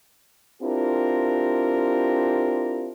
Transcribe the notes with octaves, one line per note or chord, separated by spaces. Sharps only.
C4 D4 E4 F4 G4 A#4